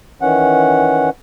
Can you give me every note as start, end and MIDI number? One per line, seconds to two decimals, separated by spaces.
0.22 1.10 51
0.22 1.10 52
0.22 1.10 61
0.22 1.10 78